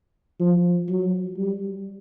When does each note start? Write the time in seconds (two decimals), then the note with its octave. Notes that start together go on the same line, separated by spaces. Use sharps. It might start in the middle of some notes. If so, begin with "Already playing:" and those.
0.40 F3
0.89 F#3
1.37 G3